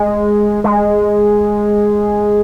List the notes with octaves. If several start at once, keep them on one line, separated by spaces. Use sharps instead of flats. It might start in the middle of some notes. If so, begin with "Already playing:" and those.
Already playing: G#3
G#3